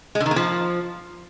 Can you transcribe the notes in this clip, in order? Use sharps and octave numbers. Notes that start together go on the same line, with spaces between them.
G#3
D3
D#3
A#3
F3